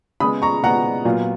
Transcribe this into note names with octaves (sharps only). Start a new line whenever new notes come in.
C#3 G#3 B3 B5 D#6
A#5 C#6
C#3 G#3 B3 F#5 A#5
A#2 F#3 B3 F4